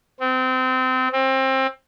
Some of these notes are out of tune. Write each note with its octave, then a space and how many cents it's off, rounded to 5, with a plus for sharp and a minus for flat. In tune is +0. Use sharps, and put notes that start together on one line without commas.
C4 -25
C4 +25